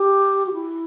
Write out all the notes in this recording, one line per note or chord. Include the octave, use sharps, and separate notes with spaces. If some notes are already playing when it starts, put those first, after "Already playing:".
Already playing: G4
F#4
E4